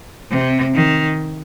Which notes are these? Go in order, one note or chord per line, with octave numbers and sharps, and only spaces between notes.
C3
D#3